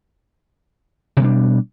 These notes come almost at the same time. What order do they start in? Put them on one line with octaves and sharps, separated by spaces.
B2 G#3 G3 D4